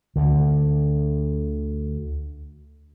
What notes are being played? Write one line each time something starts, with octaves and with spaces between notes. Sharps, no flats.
D2 D3